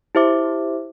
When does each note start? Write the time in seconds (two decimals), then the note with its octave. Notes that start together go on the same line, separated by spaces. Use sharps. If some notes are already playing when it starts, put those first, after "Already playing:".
0.15 E4 G4 C5 E5 D6